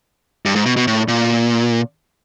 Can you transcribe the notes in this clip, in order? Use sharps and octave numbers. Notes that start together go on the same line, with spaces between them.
G2
G#2
B2
B2
A2
A#2